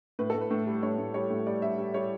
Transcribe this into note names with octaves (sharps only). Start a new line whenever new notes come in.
A2 B4
A2 A4
B4
A2
G3
A2 C#5
A2
G3 C#5
A2
G3 D5
G3 E5
G3
G3 C#5